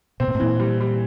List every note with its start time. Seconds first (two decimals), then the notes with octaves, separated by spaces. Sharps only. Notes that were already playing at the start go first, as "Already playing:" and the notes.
0.20 B2 C4
0.28 A#2
0.35 A2
0.40 A#2 E3
0.60 G3
0.81 G3